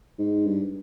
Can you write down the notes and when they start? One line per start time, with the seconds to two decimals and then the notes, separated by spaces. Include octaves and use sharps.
0.19 G#2
0.46 G2